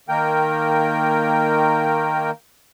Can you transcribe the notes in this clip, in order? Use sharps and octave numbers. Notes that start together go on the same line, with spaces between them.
D#3 A#3 A#4 G5